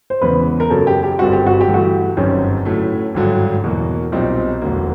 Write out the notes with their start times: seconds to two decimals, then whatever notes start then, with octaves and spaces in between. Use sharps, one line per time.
0.10 C5
0.22 E2 C#3 E3 G#3 B3 B4
0.60 A#4
0.70 F#2 C#3 F#3 A#3 A4
0.87 G4
1.03 G4
1.19 G1 G2 D3 G3 C4 F#4
1.33 G4
1.47 F#4
1.61 G4
1.68 G2 E3 A3
1.74 F#4
2.17 G1 F#2 D#3 G3 C4 C#4
2.65 A2 F#3 A3
3.14 G#1 G2 D3 F#3
3.64 E2 B2 F#3 A#3
4.12 B1 A#2 G3 C4 D#4
4.62 E1 D2 D3 F#3 A#3